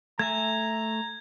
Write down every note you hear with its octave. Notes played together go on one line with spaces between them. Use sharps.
A3 E5 G#5 A#5 G#6